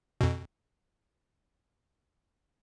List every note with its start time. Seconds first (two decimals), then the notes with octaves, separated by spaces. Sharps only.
0.21 F2 B2